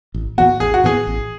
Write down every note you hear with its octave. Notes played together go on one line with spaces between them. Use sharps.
A1
A2 E3 B3 F#4
A1 G#4
F#4
A2 E3 B3 G#4
A1